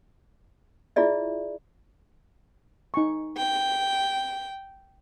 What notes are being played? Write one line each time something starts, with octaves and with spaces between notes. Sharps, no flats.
E4 F4 G#4 D5 E5
D#4 G#5 C#6
G5